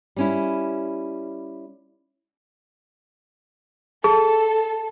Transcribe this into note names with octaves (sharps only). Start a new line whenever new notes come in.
G3 C#4 E4
G#4 A4 A5